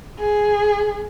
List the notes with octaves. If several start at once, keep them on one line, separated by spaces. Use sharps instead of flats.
G#4